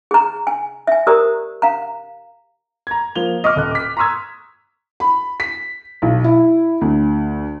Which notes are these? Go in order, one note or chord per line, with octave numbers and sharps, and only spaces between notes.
G#4 A#5
G#5
E5 G#5
G4 A#4 C5 D5 A#5 D#6
F5 A#5
A#5 G#6
F3 A#3 F7 G7
D#5 C#6 D6 F6
D#1 D#5 F#6
D6 B6
A#5 C6 C#6 D#6 E6 G#6
B5
B6
B1
E4
D2